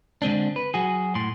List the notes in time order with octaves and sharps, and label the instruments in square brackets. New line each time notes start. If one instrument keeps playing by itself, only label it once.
[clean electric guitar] D3 G#3 C4 D4
B4
F#3 F#4 G#4
A2 C6